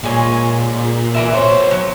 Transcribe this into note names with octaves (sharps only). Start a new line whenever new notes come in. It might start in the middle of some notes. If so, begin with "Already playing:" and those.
A#2 G#3 C#5 G#5
E3 A#4 E5
B3 C5 C#5
F#3